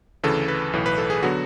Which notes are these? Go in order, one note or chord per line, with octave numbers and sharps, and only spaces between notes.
D2 C#3 E3 A4
B4
B1 A2 E3
B4
A4
G#4
D3 F#3 B3 F#4